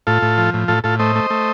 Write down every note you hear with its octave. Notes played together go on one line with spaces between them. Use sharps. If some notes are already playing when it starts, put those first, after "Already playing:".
A2 F4 A4
A2
F3
A2
A2 F4 A4
A2 F4 A4
A3 C5 D#5
A3
A3